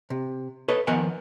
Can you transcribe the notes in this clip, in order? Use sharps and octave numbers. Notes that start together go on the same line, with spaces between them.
C3
A4 B4 C#5 D#5
D#3 F3 B3 A#4 F#5 G#5